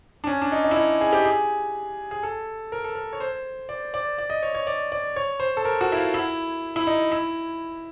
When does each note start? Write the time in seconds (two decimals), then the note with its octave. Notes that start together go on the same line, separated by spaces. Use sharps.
0.24 D4
0.27 C#4
0.42 D4
0.52 D#4
0.64 D#4
0.71 E4
0.76 D#4
1.01 G#4
1.13 G4
1.25 G#4
2.11 G#4
2.23 A4
2.72 A#4
2.84 A4
2.95 A#4
3.13 C#5
3.20 C5
3.69 D5
3.94 D5
4.18 D5
4.30 D#5
4.43 C#5
4.55 C#5
4.67 D5
4.92 D5
5.16 C#5
5.40 C5
5.57 A4
5.65 A#4
5.81 F#4
5.92 E4
5.97 F4
6.14 E4
6.76 E4
6.87 D#4
7.12 E4